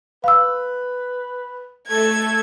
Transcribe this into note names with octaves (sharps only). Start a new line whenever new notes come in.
B4 F5 E6
A3 A4 G#6